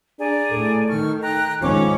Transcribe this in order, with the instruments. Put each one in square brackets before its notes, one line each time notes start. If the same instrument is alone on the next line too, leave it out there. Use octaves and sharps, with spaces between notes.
[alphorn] D4 [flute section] G#4 D5 A#5
[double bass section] A2 [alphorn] A4
[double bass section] D#3 [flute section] C#6 F6
[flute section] G5 A#5 F#6
[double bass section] G#2 D#3 C#4 [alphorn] F3 [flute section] C#5 D6